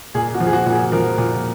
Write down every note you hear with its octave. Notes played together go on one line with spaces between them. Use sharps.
A#2 G#4
F#4
F3
G#4
F#4
A#2
G#4
F3 A#4
A#2